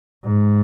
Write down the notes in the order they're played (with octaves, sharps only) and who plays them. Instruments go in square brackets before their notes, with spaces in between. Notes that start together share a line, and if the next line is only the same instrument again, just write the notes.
[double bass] G#2